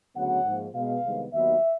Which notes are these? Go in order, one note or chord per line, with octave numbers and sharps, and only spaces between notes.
D2 C#3 F#3 B3 F#5
G#2 F3 A#3
B2 G#3 B3 F5
C2 C3 D#3 G#3 B3
D#2 D#3 F#3 B3 E5